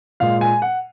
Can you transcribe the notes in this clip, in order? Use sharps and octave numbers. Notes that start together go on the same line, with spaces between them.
A#2 G#3 F5
G#5
F#5